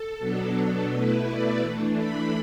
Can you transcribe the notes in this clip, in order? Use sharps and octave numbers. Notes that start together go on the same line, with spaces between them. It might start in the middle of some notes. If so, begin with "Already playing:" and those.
Already playing: A4
B2 F#3 B3 D4
B2 A3 E4 B4
D5
E3 A3 D4
B5